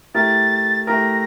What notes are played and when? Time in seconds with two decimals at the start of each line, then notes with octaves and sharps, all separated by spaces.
0.14 A3 E4 G4 A#4 A6
0.87 A3 E4 G4 A#4 A#6